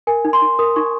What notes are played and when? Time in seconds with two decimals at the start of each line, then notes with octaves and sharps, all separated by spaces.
0.07 A#4 G#5
0.25 D#4
0.33 C6
0.42 D#4
0.59 A#4 D#6
0.76 D#4 C#6